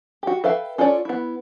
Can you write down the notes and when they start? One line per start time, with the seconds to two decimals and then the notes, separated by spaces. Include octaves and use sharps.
0.23 F#4 G4
0.44 A4 B4 E5 F5 G5
0.78 C#4 F4 A4 C#5 D5
1.05 B3 E4